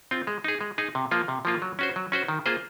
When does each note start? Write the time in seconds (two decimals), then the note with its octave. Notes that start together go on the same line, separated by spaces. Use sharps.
0.11 C4 F4
0.27 G#3
0.44 D#4 G#4
0.61 G#3
0.78 D#4 G#4
0.95 C3
1.11 F3 A#3 F4
1.28 C3
1.45 F3 A#3 F4
1.62 F#3
1.79 C#4 F#4 C5
1.96 F#3
2.12 C#4 F#4 C5
2.28 D#3
2.46 A#3 F4 G#4 C5